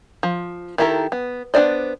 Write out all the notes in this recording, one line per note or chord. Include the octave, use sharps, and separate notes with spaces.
F3
D#3 E4 G4 A4 A#4
B3
B3 D4 C5 D5 D#5